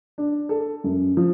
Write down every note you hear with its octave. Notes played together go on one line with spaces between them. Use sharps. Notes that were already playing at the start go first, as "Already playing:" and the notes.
D4
A4
F#2
F3